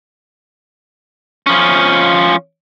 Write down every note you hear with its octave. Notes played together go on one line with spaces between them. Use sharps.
F3 C#4